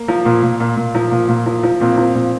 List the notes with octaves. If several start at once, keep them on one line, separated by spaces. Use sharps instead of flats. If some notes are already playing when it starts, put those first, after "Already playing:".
Already playing: A#3
F3
A#2
A#2
A#2
A#2
F3
A#2
A#2
F3
F3
A#2 C4
F3
A#2